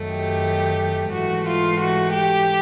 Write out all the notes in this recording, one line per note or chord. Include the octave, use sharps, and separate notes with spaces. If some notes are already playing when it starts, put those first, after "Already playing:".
Already playing: F#2 D#3 F#3 A3
G4
G#2 E3 A3 F#4
F4
F#4
G4